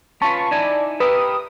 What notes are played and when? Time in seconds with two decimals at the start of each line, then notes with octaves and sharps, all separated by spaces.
0.22 C#4 F4 B4 A5 C#6
0.51 D#4 E4 D5 G#5
1.00 G4 A#4 B4 E5 D#6